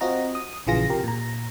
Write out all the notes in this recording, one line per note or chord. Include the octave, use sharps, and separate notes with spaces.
C4 F4 F#4 D#5 A#5
D#6
A#1 C#3 E3 F4 G#4 A#6
C3 G4 A#4
A#2 A#5